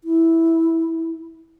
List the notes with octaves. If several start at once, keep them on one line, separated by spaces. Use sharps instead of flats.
E4